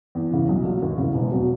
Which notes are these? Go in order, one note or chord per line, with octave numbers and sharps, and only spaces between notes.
E2
C#3 E3
B1
A#2 F#3
D#2
C#3 E3
E1
B2 F#3